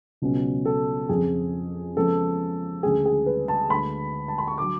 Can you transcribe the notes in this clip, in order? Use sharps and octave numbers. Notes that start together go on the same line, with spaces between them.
C#2 B2 F#3 C#4
A4
F2 C#3 F3 G#4
C#3 F3 G#3 B3 A4
D2 C#3 G#3 G#4
G#4
B4
A5
D2 D3 G#3 B5
A5
B5
C#6
D3 F#3 D6